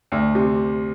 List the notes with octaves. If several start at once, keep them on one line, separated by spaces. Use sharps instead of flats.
D2
C3